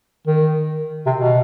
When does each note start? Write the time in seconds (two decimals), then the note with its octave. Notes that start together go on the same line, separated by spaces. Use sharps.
0.27 D#3
1.06 C3
1.17 B2